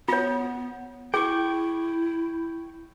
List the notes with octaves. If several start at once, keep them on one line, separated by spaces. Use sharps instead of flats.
B3 F4 C#5
E4 G#4 G5 C#6